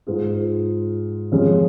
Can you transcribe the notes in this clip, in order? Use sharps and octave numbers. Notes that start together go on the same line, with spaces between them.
G#2 G#3 F4 G#4
F2 F3 G#3 C#4